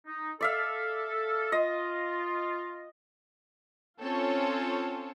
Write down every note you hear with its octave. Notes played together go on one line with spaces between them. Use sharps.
D#4
A4 D5 E5 F5
F4 D#5
C4 C#4 F4 A4 C#5